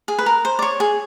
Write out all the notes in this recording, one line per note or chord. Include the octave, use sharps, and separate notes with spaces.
G#4
B4
A#4
C5
D5
C#5
G#4